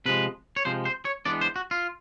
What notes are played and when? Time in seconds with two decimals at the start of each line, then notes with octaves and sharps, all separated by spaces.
0.06 C3 F3 G#3 B4
0.56 C#5
0.65 C3 F3 G#3 C5
0.85 C5
1.05 C#5
1.26 E3 G#3 B3 D4 D5
1.41 C5
1.56 F#4
1.71 F4